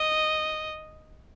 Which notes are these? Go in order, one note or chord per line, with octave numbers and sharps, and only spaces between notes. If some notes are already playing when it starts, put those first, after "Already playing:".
Already playing: D#5